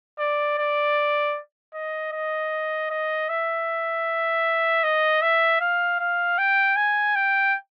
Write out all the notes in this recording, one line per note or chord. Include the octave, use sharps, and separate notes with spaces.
D5
D5
D#5
D#5
D#5
E5
D#5
E5
F5
F5
G5
G#5
G5